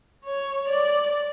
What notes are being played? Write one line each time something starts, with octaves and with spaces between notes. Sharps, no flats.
C#5
D5